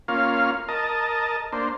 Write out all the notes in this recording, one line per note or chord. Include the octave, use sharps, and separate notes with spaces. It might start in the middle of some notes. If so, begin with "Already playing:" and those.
A#3 C#4 F4 F5
A#4 D#5 A5
A#3 D4 C5